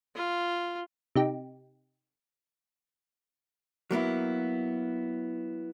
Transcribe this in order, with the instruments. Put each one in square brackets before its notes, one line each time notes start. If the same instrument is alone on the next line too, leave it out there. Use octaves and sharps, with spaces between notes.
[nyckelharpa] F4
[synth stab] C3 D#4 G4
[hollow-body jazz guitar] F#3 A#3 B3 E4